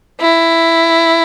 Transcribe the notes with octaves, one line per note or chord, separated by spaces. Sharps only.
E4